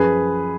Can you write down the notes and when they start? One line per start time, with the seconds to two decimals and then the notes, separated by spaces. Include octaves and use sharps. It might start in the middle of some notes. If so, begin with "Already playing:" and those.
Already playing: F#2 F3 G#4 B4